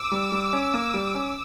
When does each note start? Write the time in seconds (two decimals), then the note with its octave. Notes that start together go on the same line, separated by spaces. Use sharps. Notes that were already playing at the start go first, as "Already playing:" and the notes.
Already playing: D6 E6
0.12 G3
0.32 G3
0.53 C#4
0.74 A#3
0.94 G3
1.15 C#4